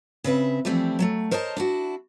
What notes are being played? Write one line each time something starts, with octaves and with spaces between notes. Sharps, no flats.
C#3 C4 B4 E5
E3 F3 G3 A3 C4
F#3 G#3 A3
A#4 C5 C#5 D#5 A5
D4 E4 F#4